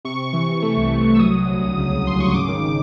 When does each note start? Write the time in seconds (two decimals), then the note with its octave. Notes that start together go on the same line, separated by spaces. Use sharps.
0.05 C3 C#6
0.19 C3
0.33 E3
0.47 C3
0.62 A3
0.77 C2
0.91 C3
1.04 C2
1.14 E6
1.19 F#3 D#6
1.34 F#3
1.47 D2
1.62 F#3
1.76 C#3
1.90 C#3
2.05 F#3 C6
2.19 C#3 C#6
2.33 G#1 D6
2.48 D#3